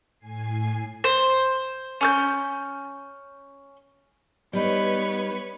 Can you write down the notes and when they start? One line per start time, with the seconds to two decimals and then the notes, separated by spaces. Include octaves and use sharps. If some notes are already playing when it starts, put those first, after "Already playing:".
0.19 A2 G#5 C7
1.04 C5
2.01 C#4 E6 G6
4.53 G3 B3 D#4 B4 C#5